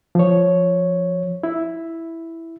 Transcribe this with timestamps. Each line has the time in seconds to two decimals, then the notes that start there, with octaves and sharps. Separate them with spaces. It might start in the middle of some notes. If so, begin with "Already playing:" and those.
0.15 F3 C#5
1.43 E4